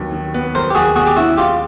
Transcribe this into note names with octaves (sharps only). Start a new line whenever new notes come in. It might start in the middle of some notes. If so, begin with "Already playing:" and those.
Already playing: D#2 D#3 F#3 B3
D#3
B3
F#3 A#4 C5
G4
D#2 F#4 G#4
B2 F#4 G#4
G4
C#4 E4 F#4
G#3 F4 G4